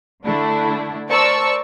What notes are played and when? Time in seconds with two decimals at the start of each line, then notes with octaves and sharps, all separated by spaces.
0.25 D3 A3 D4 E4
1.09 A#4 C5 D5 A5 C#6 E6